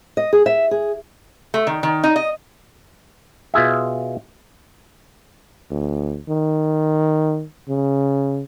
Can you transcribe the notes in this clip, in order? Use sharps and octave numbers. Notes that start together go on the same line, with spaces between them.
D#5
G#4
E5
G#4
A3
D#3
D#3
D#4
D#5
B2 F4 G#4 E5
D2
D#3
C#3